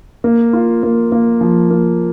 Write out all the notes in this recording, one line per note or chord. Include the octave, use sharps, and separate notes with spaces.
A#3
F4
A#3
A#3
F3
A#3